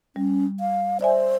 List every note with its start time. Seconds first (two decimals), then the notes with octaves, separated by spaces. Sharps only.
0.16 G3 C#4
0.60 F5
1.01 C5 D5 E5 G#5